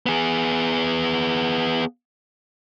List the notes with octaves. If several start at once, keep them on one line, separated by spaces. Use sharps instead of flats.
B3 G#4